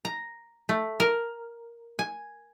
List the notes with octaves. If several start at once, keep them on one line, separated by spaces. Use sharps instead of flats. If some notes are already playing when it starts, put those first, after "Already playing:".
A#5
A3
A#4
G#5